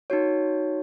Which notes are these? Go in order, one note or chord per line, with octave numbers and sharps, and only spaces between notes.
D#4 F#4 C#5